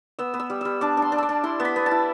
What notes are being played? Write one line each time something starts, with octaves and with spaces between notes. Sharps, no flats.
B3 E6
B3
E6
G3
G3 E6
D4 D6
D4 C6
D4
D6 E6
D4
E4 C6
B3
B5
B3
A5
E4